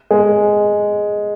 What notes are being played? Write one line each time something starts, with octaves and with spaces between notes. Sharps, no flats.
G#3